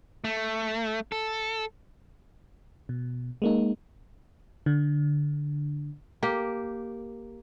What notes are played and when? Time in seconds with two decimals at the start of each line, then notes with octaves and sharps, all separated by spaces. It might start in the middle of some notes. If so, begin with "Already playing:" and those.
0.24 A3
1.12 A4
2.89 B2
3.42 G#3 A#3 D#4
4.66 D3
6.23 A#3 G4